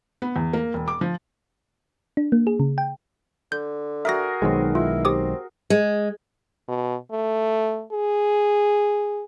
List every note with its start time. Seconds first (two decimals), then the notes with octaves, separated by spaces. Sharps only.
0.22 B3
0.36 E2
0.53 A#3
0.74 E1
0.88 D6
1.01 F3
2.17 D4
2.32 A#3
2.47 G#4
2.60 C#3
2.78 G5
3.52 D3 G6
4.05 F#4 G#4 A#4 E5 A#6
4.42 B1 D#3 G#3 C4
4.75 E4 F4
5.05 C4 G4 D6 D#6
5.70 G#3
6.68 B2
7.12 A3
7.92 G#4